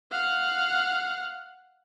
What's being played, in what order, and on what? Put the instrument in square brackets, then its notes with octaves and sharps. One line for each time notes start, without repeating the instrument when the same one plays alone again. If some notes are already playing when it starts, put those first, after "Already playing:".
[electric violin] F5 F#5